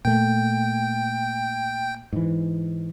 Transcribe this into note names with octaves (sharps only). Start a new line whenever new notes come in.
A#2 A3 G5
G#2 E3